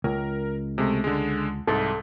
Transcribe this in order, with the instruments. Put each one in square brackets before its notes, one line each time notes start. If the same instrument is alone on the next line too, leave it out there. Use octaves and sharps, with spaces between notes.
[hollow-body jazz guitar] C#2 [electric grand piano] A#4
[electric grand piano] C3 G#3 A3
D3 G#3
[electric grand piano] C2 G#2 [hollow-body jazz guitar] A4